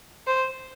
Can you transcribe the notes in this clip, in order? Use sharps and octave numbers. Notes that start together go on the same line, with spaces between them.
C5